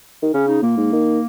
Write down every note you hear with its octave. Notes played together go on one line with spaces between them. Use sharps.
D#3
C#3 C#4
D#4
A#2 A#3
G#2
D#3